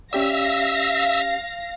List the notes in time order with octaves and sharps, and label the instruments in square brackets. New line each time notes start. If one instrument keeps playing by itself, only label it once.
[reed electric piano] C#4 G4 D5 [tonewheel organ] E5 E6 [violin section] F5 A#6